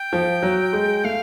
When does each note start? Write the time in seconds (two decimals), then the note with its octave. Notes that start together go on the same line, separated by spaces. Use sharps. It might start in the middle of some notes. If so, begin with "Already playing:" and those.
Already playing: G5
0.13 F3
0.43 F#3
0.73 G#3
1.04 A3 F5